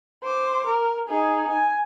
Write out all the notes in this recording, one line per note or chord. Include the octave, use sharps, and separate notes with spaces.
C5 D6
A#4
D#4 G#4
G#5